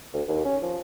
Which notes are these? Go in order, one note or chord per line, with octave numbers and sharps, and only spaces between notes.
D2
D#2
C#4
F3